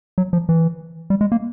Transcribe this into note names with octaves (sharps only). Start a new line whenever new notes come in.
F#3
F3
E3
G3
G#3
A#3